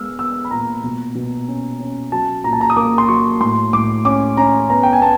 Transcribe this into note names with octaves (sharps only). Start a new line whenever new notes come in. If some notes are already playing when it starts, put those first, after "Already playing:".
Already playing: G#3 B3 E6 F6
B3 E6
B5
A#2 A#5
B2
B2
C#4
C#4
F#3 A5
A#2 A#5
A5
A#5
D#6
A#3 D6
C6
F#3 C#6
A2 C6
A2 D6
C#4 D6
C#4 A#5
B3 A#5
G5
G#5
B3 A5